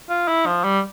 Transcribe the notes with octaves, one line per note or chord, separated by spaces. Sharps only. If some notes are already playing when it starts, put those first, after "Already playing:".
F4
E4
F3
G3